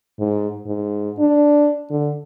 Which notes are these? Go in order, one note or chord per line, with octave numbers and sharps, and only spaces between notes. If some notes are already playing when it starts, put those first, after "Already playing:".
G#2
G#2
D4
D3